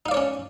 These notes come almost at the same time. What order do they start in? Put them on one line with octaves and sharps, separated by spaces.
D#4 F5 D5 C#5 C#4